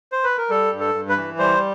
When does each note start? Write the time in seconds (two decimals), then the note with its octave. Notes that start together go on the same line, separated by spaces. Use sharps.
0.12 C5
0.24 B4
0.38 A#4
0.50 G3 A4
0.72 G2
0.80 A4
0.94 G2
1.09 B4
1.17 E3
1.38 G3 C5